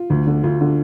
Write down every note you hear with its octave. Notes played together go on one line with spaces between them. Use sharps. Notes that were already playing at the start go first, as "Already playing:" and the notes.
Already playing: F4
D2
D3
D2 F4
D3